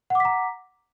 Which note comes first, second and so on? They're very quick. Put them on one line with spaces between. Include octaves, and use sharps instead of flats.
F#5 D6 B6 A#5